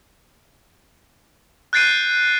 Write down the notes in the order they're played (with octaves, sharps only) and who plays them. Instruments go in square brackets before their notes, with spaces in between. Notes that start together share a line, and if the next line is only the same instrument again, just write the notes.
[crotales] F#6 G6 A6 C7 D7 D#7